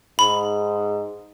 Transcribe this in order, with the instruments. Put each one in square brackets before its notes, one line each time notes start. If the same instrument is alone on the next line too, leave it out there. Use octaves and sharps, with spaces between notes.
[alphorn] G#2 [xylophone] B5